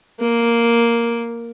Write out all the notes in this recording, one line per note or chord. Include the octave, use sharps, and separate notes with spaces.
A#3